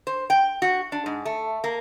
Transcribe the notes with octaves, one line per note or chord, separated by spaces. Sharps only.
C5
G5
F#4
D4
G#2
A3
A#3